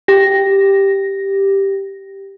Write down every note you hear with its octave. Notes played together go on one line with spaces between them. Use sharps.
G4 A#6